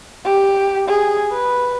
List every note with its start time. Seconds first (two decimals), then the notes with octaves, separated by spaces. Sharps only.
0.24 G4
0.88 G#4
1.32 B4